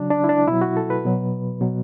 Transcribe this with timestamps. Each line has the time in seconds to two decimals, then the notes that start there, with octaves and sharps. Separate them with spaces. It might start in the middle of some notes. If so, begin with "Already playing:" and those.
Already playing: C#3 F#3 D4
0.10 D4
0.24 E4
0.29 D4
0.48 B2 F#3 E4
0.61 F#4
0.77 A4
0.90 B4
1.05 B2 F#3
1.61 B2 F#3